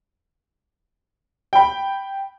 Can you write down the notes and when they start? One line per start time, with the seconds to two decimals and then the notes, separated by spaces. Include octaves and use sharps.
1.53 G5 B5